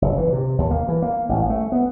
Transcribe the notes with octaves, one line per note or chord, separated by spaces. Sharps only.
F#1
E3
C3
D#2
A#3
E3
A#3
A1
A3
B3